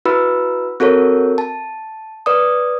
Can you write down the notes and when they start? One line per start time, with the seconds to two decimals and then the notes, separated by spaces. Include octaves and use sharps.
0.05 E4 F#4 B4 B5 E6
0.80 C4 F#4 A4 A#4 C#5
1.38 A5
2.26 B4 D5 D#6